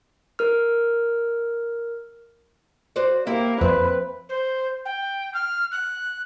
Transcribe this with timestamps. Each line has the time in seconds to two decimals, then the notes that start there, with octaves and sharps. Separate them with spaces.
0.39 A#4 F6
2.96 F#4 C5 D5
3.27 A#3 E4 G4
3.61 F2 C4 B4
4.29 C5
4.85 G5
5.34 F6
5.71 F#6